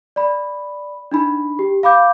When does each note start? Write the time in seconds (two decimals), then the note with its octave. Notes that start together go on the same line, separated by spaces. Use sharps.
0.16 D5 B5
1.11 D4 D#4 B5
1.59 G4
1.83 F5 B5 D6 G6